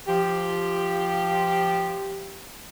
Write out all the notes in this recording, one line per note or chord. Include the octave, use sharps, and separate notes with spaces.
F3 G4